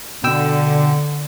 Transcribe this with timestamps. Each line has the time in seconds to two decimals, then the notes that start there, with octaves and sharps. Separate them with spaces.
0.24 B2 D3 G5 E6